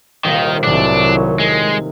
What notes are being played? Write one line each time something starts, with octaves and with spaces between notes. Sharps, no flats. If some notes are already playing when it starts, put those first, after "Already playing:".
D#1 C2 D#3 C4
C2 A2 D#3 F#3 D4
G#3